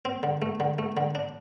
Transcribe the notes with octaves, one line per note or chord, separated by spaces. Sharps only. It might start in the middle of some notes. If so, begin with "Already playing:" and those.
C4
D3
A3
D3
A3
D3
D4